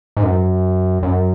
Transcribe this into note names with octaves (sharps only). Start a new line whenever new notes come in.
G#2
F#2
F#2